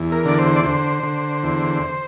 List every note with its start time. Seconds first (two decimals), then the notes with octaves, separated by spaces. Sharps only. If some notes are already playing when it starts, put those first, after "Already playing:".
Already playing: E2
0.12 A#4
0.25 D3 D5
0.39 C5
0.56 D5
0.64 D3 C5
1.03 D3
1.43 E2